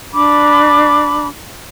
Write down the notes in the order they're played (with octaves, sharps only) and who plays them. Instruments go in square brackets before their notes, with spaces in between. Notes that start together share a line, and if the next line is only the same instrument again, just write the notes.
[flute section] D4 B5 D6